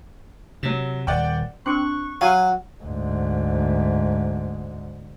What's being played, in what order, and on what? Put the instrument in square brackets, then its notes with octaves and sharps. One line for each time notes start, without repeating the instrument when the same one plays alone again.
[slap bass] C3 [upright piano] F#3 E7
[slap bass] D#1 [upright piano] D5 F#5 G5
[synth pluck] C4 D4 [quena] C#6 [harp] F#6 C#7
[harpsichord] F#3 [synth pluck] F5 G#5 F6 [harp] F#5
[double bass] D2 G#2